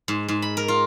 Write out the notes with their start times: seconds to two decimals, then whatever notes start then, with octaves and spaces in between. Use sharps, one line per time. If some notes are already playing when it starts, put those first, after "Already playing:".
0.08 G#2
0.28 G#2
0.42 B5
0.57 A#4
0.68 F4